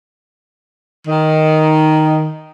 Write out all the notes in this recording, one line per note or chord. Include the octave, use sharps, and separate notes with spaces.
D#3